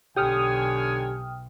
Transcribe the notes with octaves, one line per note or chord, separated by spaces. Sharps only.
B1 D3 G4 C#5 G5 G#5 D#6 F6